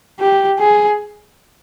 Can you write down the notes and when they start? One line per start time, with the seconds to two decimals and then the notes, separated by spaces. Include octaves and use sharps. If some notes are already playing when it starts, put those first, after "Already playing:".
0.20 G4
0.59 G#4